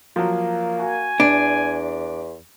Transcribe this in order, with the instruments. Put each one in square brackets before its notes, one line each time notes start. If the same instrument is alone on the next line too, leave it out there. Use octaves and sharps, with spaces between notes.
[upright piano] F3 F#3 [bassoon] A#3
[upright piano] F#4 [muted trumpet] G#5
[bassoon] E2 [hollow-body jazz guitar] D4